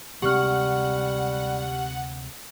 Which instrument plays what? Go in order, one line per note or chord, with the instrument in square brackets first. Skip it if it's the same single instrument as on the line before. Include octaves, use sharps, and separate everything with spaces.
[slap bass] D2 C3 G#3 [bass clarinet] G3 [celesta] G4 C#6 F6 [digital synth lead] F#5